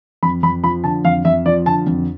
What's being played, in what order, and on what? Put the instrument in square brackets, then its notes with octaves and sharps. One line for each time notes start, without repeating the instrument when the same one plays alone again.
[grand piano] F2 B5
F2 B5
F3 B5
D3 A5
F2 F5
F2 E5
F3 D5
D3 A5
F2